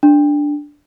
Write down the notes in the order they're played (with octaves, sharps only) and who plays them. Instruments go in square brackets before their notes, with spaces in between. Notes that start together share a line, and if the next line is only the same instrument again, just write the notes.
[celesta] D4